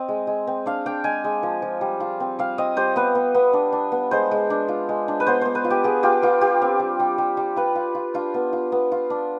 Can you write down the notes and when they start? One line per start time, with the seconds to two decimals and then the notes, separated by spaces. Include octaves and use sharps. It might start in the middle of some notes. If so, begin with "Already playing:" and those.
Already playing: C4 D#5
0.09 G#3
0.27 G#3
0.47 C4
0.66 D4 F5
0.86 D4 G5
1.04 G#3 G#5
1.24 G#3
1.43 F3
1.62 F3
1.81 G3
2.00 F4
2.20 C4
2.39 G3 F5
2.58 C4 D#5
2.77 G3 C5
2.96 B3 B4
3.15 B3
3.35 B3
3.53 D4
3.73 D4
3.92 B3
4.11 G#3 C5
4.31 G#3
4.50 D4
4.68 F4
4.89 G#3
5.08 D4
5.20 B4
5.26 B3 C5
5.41 B3 C5
5.55 B4
5.64 F4
5.70 G4
5.84 B3 G#4
6.03 F4 G4
6.22 B3 F4
6.41 F4 G4
6.62 C4
6.80 G3
7.00 G3
7.18 G3
7.37 G3
7.56 F4 B4
7.75 F4
7.95 F4
8.14 D4 F4
8.34 B3
8.53 F4
8.72 B3
8.92 F4
9.10 D4